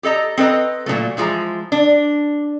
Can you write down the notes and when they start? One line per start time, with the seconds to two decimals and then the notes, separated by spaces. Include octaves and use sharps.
0.03 G4 A4 D#5 A#5
0.37 C4 A4 B4 D#5 A#5
0.86 A#2 D#3 F#3 A3
1.17 E3 F3 G#3 A#5
1.72 D4